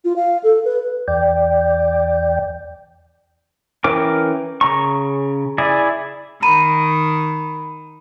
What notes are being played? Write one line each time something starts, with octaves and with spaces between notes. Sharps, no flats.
F4
F5
A4
B4
E2 D5 G5
E3 C#4 A#4 G5 D6
C#3 A#5 C#6
E4 G#4 D5
D#3 A#5 B5 D#7